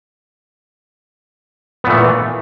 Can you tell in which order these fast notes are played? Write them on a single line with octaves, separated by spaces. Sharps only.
B3 A#2 A3 E3